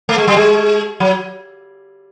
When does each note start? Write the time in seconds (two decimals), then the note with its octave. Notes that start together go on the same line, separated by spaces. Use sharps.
0.09 A3
0.18 G#3
0.28 G3
0.37 G#3
1.00 F#3